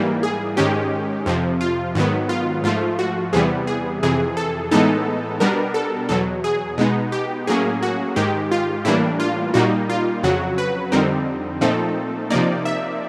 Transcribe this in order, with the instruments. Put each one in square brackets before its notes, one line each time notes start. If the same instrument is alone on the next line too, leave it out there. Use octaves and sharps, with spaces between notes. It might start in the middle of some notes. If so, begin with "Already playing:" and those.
Already playing: [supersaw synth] G#2 E3 G3 A#3
G#4
G#2 D#3 G#3 C#4 G4
F2 C3 F3
F4
G#2 D#3 F#3 B3
F4
G#2 F3 A3 F4
F#4
E2 C3 E3 G3 B3 G#4
G#4
F2 C3 E3 G#4
A4
A2 E3 G#3 B3 D#4 A4
B2 G3 B3 D4 A#4
A4
E2 B2 F#3 A4
G#4
B2 G#3 B3 D#4
G4
A2 F#3 A#3 C#4 G#4
F#4
G#2 D#3 G#3 G4
F4
A2 E3 G3 A#3 D4 E4
F4
A#2 G3 A#3 D#4 F#4
F4
F2 C#3 F#3 F#4
B4
F2 D3 G3 C4 D#4 A#4
A#2 F3 A3 C4 D#4 A4
C3 F3 A#3 D#4 D5
E5